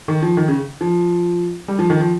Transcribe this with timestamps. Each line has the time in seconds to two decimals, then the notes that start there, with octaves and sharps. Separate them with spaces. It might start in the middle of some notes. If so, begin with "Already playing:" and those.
0.08 D#3
0.22 F3
0.37 D#3
0.48 C#3
0.81 F3
1.68 G3
1.79 F3
1.90 D#3
2.00 F3